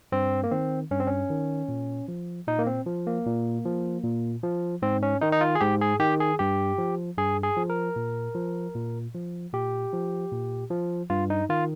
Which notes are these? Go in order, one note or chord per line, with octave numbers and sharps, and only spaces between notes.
G2 C4
A#3
D#3 C4
G2 C#4
C4
C#4
D#3
A#2
F3
A#2 D#4
A#3
C4
F3
A#3
A#2
F3
A#2
F3
G#2 C4
C#4
D#3 D#4
D#4
F4
G#4
G#2 G4
G#4
D#3 G4
G#4
G2 G4
F3
G2 G#4
G#4
F3
A#4
A#2
F3
A#2
F3
A#2 G4
F3
A#2
F3
G2 F4
D#4
D#3 F4